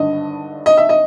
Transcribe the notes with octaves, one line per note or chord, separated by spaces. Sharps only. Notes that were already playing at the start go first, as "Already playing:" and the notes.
Already playing: G#1 G2 D3 D#5
D#5
E5
D#5